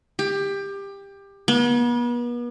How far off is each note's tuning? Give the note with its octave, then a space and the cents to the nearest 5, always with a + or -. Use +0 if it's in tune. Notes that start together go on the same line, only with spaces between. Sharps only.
G4 +20
B3 -40